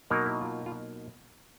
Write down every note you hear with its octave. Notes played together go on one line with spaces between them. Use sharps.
B2 F#3 A#3 D#4 A#4
E4
F4
F4